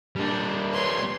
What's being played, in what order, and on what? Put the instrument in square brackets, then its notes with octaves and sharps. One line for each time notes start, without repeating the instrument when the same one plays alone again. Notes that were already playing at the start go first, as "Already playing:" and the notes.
[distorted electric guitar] G3 A#3 [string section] D4
[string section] B4 C#5 C6